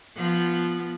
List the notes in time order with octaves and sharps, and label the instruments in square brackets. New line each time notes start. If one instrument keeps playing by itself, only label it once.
[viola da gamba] F3 B3